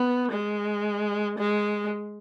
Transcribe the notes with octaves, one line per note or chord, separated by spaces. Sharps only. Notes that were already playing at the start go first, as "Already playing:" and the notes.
Already playing: B3
G#3
G#3